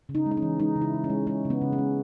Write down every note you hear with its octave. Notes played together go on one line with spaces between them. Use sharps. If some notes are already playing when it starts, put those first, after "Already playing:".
C#3
D#4
G#3
D#4
C#4
E3
G#3 D#4
C#3
E4
C#3
C#4
G#3
G#3 C#4
C#3
B3
C#3
C#4
G#3